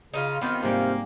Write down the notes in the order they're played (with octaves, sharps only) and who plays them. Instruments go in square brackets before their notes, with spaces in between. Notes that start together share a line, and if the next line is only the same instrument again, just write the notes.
[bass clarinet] C#3 [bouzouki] D#4 F4
[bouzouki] D#3 F4 [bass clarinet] B3 [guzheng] C4 G4
[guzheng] G#2 G3 G5 [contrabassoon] C3 [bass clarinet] A#3